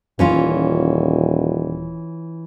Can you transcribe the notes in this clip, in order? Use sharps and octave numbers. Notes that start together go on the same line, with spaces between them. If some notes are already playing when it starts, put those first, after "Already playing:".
D#1 E3 C#4 F4